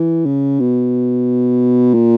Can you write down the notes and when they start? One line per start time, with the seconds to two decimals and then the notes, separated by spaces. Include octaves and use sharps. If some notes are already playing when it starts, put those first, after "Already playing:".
Already playing: E3
0.26 C#3
0.60 B2
1.94 A#2